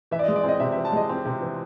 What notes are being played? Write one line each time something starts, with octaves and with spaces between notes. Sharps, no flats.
E3 E5
D5
G#3 D#5
D5
C4
D#5
C3 E5
E3 E5
A5
G#3 D#5
C4
C3
E3